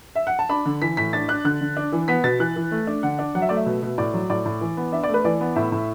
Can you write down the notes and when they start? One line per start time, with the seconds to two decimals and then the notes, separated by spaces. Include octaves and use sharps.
0.15 E5
0.27 F#5
0.39 A5
0.49 D4 B5
0.66 D3
0.82 E3 B6
0.97 A2 B6
1.13 D4 A6
1.29 D4 F#6
1.45 D3 F#6
1.61 D3
1.77 D4
1.92 E3
2.08 B3 B6
2.24 B2 A6
2.39 E3 F#6
2.56 E3
2.71 A3
2.87 D4
3.03 D3 F#5
3.19 D4
3.35 F#3 F#5
3.42 E5
3.49 A3 D5
3.56 E5
3.66 B2
3.82 B2
3.98 A2 D5
4.14 F#3
4.30 A2 D5
4.45 A2
4.61 E3
4.77 B3
4.92 D4 E5
5.04 A3 D5
5.14 B4
5.25 E3 D5
5.41 B3
5.56 A2 E5
5.72 A2